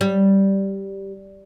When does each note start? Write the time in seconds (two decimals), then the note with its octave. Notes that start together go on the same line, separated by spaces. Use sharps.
0.01 G3